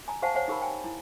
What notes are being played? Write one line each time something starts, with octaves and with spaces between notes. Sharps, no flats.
G#5 A#5
G4 C5 F5 F#5 G#5 A5
C5 C#5 F5 F#5 G#5
D#4 G4 A#4 B5
G5 G#5
E4